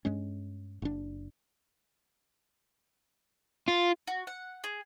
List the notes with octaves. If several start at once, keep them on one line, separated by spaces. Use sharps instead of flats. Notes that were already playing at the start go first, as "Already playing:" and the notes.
G2 G#3 C#4
F#1 D4
F4
F#4
F#5
G#4